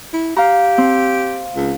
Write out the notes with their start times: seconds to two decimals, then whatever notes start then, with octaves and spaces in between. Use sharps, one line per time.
0.13 E4
0.36 G4 F5 A#5
0.78 C4
1.56 C#2